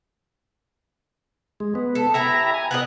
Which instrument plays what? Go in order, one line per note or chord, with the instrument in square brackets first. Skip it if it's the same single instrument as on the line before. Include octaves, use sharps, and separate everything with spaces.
[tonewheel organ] G#3
B3
[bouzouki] A4
[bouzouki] E4 G4 B4 [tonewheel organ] E5 A#5
[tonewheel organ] G#5
[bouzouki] B3 A#4 D#5 [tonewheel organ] F#6